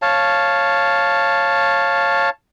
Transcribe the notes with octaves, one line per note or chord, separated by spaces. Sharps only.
C#5 F5 A5